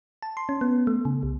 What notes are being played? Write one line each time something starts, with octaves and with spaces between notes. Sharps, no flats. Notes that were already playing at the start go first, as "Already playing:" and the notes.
A5
C6
C#4
B3
A3
C#3
C2